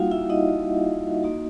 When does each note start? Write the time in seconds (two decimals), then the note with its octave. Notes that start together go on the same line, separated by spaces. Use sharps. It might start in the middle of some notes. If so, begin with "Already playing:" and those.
Already playing: G3 A#3 D#4 F4 F#4 F5 F#5
0.11 E4 E5
0.29 D#4 D#5
1.22 A#3 D#4 F#4